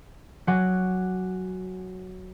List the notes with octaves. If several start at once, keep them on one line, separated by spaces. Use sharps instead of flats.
F#3 F#4 F#5 G#5 D6